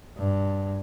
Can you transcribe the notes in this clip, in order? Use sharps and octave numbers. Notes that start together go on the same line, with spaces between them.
G2